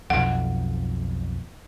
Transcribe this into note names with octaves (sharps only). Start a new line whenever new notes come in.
B1 F2 F#5